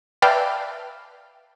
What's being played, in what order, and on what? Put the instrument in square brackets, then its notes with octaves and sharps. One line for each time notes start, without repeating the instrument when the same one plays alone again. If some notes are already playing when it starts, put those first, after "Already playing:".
[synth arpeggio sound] B4 D5 E5 F5 G5 A5